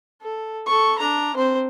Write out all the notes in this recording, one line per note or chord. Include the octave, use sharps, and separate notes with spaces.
A4
A4 C#6
D4 A#5
C4 C5